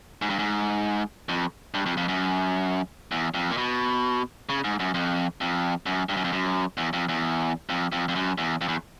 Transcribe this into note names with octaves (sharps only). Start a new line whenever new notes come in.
G#2
G2
G#2
F2
G2
F2
F2
F#2
E2
F2
A#2
B2
C#3
G#2
F#2
F2
F2
F#2
G2
F#2
F2
F#2
E2
F2
E2
F2
F2
F2
F#2
E2
F2
E2